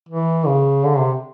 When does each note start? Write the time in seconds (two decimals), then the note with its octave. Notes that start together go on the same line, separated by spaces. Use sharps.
0.09 E3
0.47 C#3
0.84 D3
0.98 C3